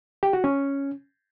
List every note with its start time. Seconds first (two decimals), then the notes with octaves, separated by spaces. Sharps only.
0.23 G4
0.33 F#4
0.44 C#4